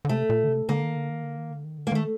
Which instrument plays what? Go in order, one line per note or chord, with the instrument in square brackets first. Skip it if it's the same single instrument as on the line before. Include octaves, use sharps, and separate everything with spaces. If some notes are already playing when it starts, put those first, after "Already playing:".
[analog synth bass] D3
[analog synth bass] C3 [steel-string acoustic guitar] A3
[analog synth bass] A#2
D3
C3
[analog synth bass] D3 [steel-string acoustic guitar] A#3
[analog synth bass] D#3
D3
D#3
D3
D#3
D3
D#3
D3
[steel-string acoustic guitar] A#3
[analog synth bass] D#3 [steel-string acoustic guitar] A3